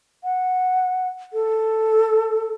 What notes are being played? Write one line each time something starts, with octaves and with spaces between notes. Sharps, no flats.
F#5
A4